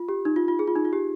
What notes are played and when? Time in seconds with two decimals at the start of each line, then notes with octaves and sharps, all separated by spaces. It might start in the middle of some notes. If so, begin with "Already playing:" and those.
Already playing: F4
0.09 G4
0.25 D#4
0.36 F4
0.48 F4
0.59 G#4
0.68 F4
0.76 D#4
0.85 F4
0.93 G4